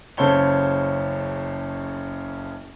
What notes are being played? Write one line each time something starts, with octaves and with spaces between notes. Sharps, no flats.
F#1 C#3 A4 C5 C#5 G7